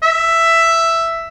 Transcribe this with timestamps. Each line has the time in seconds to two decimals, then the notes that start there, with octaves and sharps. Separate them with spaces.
0.03 E5